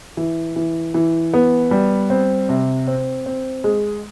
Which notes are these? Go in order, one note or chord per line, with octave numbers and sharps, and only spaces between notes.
E3
E3
E3
B3
G3
C4
C3
C4
C4
G#3